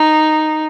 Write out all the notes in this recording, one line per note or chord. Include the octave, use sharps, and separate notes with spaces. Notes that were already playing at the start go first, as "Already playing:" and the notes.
Already playing: D#4